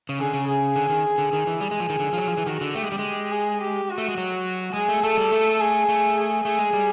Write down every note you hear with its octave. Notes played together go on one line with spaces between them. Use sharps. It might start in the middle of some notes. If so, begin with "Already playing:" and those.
C#3
D3 G#4
C#3
G#4
D3
D#3
D3
D#3 G#4
E3
G3 G#4
G#3
F3
D#3
D3
F3
F#3
F3
E3
D#3 F#4
D3
A3 G4
G#3
G3
G#3
G#4
G4
F#4
A3
G#3
F#3
G#3 G#4
A3
A3 A4
G3
A3
G#4
A3
G#4
A3 G#4
G#3
G3